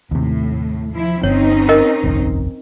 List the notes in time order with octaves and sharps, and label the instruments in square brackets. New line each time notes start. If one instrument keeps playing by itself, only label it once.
[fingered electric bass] D#2 C3 [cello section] A2
[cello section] F3 E4
[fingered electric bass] G1 [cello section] C4 C#4 D#4 [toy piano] C#5
[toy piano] A#4 D#5
[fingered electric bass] F#1 B1 E2